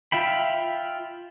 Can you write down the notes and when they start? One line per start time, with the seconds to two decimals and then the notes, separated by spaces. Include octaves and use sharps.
0.12 F4 E5 G5 B5